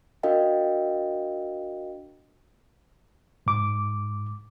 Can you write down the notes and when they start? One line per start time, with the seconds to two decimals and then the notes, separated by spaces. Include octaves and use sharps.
0.23 D4 F#4 A#4 D#5 F5 G5
3.46 G#2 D6